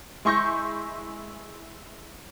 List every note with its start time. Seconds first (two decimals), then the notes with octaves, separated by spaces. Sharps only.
0.25 G#3 E4 C6 C#6 G6 A#6